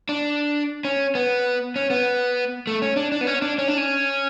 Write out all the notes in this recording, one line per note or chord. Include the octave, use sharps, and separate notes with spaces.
D4
C#4
B3
C#4
B3
A3
C#4
D4
D4
B3
C#4
D4
C#4
D4
C#4